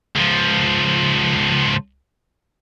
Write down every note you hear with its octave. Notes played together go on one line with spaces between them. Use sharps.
C#2 F3